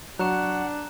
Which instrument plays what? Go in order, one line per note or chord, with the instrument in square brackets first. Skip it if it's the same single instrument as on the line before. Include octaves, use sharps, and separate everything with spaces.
[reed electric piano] F#3 C#6 [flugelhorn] D4 [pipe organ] F#5 [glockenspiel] A#5 F#6 E7